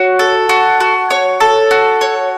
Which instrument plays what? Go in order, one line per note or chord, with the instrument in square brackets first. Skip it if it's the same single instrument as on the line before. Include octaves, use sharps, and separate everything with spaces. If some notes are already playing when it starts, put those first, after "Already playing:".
Already playing: [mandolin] F#4 C#5
A4
F#4
F#4
C#5
A4
F#4
C#5